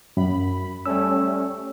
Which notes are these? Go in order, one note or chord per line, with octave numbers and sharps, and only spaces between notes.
F#2 B5
G3 A3 C#4 E6